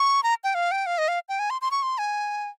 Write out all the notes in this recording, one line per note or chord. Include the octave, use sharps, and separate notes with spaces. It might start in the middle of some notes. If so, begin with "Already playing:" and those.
Already playing: C#6
A#5
G5
F5
G5
F5
D#5
F5
G5
G#5
C6
C6
C#6
C6
G#5